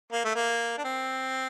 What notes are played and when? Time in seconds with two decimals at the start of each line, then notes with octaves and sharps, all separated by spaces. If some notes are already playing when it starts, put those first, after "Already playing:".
0.12 A#3
0.25 A3
0.35 A#3
0.78 D4
0.85 C4